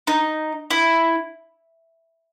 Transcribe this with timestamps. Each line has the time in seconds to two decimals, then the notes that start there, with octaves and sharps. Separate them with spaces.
0.07 D#4
0.71 E4